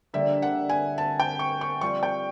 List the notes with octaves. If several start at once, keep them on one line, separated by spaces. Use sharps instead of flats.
D3 G3 A#3 D4 E5
F#5
G#5
A5
G5
C#6
C#6
G3 C4 F4 C#6
G5